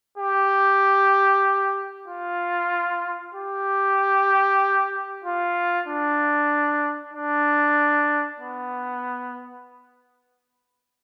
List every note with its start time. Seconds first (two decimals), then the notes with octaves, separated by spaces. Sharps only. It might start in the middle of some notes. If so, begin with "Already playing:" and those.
0.18 G4
2.08 F4
3.35 G4
5.24 F4
5.88 D4
7.14 D4
8.40 B3